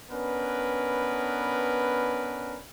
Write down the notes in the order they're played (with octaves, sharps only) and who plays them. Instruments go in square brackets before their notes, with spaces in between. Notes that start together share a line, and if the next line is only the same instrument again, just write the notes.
[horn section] B3 C#4 D4 A#4 B4